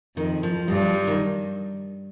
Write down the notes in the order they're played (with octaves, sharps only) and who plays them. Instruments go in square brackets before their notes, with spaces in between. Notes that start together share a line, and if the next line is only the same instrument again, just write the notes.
[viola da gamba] F2 [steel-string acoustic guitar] D#3
[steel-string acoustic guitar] F3
[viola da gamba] G2 [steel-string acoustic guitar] G3
[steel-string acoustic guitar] F3
G3
D#3